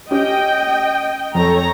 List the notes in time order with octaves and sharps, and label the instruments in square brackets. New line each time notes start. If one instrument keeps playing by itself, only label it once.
[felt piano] C#4 G4 [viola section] D#5 G5
[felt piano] F2 [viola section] A4 C#5 A#5